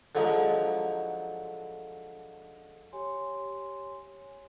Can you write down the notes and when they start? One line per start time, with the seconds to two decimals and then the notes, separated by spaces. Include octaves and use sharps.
0.15 D3 F3 F#3 G#3 D#4
2.93 G4 C#5 G#5 C6